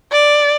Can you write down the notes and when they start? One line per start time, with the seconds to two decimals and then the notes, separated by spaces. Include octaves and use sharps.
0.12 D5